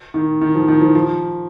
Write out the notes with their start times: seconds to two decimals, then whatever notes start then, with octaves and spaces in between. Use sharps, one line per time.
0.14 D#3
0.41 D#3
0.55 F3
0.68 D#3
0.81 F3
0.95 F3